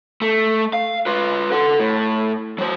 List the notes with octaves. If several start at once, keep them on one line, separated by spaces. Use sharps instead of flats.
A3
F5
F4 B4
A4 F#5
A2
F#3 C5